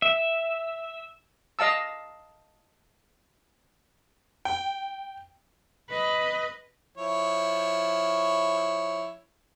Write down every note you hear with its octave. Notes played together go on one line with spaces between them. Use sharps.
E5
D#5 F5 A5 E6
G5
B4 D#5
F3 E4 C#5